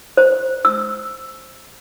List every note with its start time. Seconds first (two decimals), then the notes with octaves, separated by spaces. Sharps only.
0.17 C5
0.65 E6